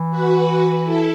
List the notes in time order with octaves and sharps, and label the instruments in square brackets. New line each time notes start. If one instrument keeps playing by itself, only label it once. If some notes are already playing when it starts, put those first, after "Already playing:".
Already playing: [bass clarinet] E3
[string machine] F#4 B4
E4 A4